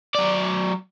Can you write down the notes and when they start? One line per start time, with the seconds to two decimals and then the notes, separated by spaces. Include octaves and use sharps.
0.15 F#3 D5